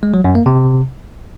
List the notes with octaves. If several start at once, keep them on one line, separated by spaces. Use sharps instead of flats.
G#3
F#3
F#2
A#3
C3